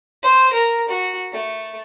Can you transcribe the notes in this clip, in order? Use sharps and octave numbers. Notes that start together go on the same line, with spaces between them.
C5
A#4
F#4
A3